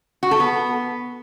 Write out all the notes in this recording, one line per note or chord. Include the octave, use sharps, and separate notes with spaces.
F#4
A4
B3